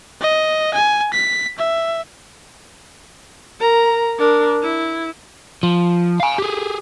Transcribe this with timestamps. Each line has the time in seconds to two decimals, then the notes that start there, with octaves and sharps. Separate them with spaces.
0.21 D#5
0.74 G#5
1.13 B6
1.58 E5
3.59 A#4 A#5
4.18 D4 A#4
4.62 E4
5.63 F3
6.20 F5 G#5
6.38 G4 G#4